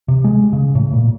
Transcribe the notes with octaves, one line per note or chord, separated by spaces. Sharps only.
C3
G#3
C#3
A2
A#2